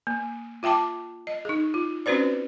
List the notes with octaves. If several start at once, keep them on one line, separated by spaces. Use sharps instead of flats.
A#3
F4 E5 G5 A5 D6
D#5
D#4 G#4
F4
C4 C#4 F#4 B4 C5 D5